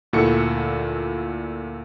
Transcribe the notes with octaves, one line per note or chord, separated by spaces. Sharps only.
D2 A#2 E4 F#4 A4 C#7